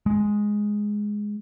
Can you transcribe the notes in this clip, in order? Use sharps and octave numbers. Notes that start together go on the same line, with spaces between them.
G#3